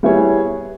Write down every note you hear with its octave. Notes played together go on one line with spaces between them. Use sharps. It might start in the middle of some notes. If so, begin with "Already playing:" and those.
G3 B3 E4 G#4 C#5